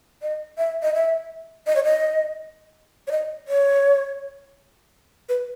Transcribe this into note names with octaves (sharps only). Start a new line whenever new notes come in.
D#5
E5
D#5
E5
D#5
C#5
D#5
C#5
D#5
C#5
B4